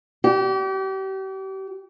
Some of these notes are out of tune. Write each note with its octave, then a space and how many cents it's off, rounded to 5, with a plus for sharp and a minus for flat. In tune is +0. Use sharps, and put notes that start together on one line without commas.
G4 -35